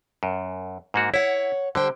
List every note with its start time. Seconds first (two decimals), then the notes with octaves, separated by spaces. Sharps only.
0.23 F#2
0.94 G#2 A#3 F#4
1.14 E4 C#5 F#5
1.75 D3 G3 C5 G5